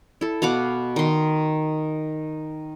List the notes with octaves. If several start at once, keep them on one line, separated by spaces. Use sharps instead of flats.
E4 A4
B2 F5 F#5 D6
D#3 C6